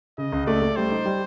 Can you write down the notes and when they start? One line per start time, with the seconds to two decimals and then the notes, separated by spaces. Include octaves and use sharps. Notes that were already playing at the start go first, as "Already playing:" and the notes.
0.18 C#3 D#5
0.32 C#2
0.46 A3 D5
0.62 A3
0.76 G3 C5
0.91 D#4
1.05 G3